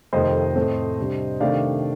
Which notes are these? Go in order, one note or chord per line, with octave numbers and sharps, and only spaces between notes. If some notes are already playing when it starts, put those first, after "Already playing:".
F2 C3 D#3 A3 C5 D#5
A2 A3 C4
C3 G3 D4
C3 D#3 A3 D4 D5 F5